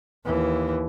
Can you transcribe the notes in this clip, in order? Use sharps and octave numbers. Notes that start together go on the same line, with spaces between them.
D#2 E3